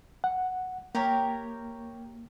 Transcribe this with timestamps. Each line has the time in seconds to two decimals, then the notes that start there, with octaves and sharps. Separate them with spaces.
0.24 F#5
0.95 A#3 G4 A#4 C#5